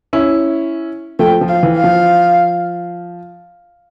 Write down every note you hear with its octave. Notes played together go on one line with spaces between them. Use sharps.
C#4 E4
F3 A3 G5
F3
F5
E3
F5
F3